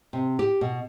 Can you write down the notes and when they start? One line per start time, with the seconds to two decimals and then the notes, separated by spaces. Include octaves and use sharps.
0.13 C3
0.39 G4
0.61 B2